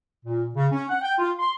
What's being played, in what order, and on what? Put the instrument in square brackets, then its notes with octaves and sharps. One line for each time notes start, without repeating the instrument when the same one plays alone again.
[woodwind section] A#2
C#3
C#4
F#5
G5
F4
C6